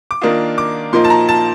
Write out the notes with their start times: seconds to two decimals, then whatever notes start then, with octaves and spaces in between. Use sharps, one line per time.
0.11 D6
0.21 D#3 A#3 D4 F4 D#6
0.58 D6
0.93 A#2 F3 A#3 D#4 C6
1.04 A5
1.10 A#5
1.29 A5